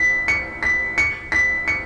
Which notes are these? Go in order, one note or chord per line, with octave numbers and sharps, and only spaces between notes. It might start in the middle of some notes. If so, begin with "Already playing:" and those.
Already playing: B6
C#7
B6
C#7
B6
C#7